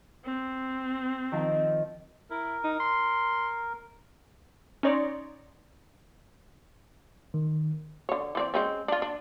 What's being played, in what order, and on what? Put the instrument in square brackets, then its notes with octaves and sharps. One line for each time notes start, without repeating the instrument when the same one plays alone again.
[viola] C4
[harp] D#3 F3
[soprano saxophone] E4 [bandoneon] A#4
[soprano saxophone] D#4
C6
[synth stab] C#4 D#4 C#5 D5 C6 A#6
[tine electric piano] D#3
[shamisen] D3 C#5
E3 C4 D5
G#3 C4 C#4
D4 F4
D4